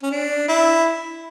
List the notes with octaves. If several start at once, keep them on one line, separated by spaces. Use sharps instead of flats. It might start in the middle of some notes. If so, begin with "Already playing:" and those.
C#4
D4
E4